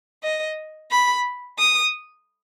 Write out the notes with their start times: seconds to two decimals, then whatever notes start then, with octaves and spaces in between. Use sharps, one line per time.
0.23 D#5
0.91 B5
1.59 D#6